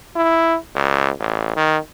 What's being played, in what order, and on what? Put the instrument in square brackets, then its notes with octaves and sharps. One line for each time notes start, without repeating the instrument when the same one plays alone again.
[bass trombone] E4
C#2
A1
D#3